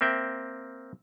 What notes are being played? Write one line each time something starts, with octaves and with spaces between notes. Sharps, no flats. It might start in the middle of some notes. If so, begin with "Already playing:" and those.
A#3 C4 E5 G5